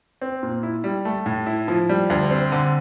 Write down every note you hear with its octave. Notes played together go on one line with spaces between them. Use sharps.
C4
A#2
E4
G3
A3
A2
E4
F3
G3
D2
C4
D3